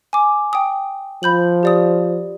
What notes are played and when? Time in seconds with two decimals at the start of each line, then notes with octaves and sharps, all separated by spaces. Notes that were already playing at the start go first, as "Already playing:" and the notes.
0.13 G#5 D6
0.53 G5 D#6
1.23 F3 B5 G6 F#7
1.63 G4 D5 D#6